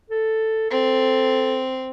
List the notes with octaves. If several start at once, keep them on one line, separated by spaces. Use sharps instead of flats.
A4
C4 A4